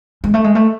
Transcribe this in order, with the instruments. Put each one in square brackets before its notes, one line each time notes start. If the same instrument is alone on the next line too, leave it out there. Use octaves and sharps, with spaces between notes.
[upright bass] G#3
A3
G#3
A3